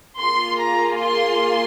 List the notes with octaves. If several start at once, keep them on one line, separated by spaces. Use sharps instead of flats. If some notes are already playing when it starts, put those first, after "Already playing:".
A#3 F4 G#4 C6
A#5
C6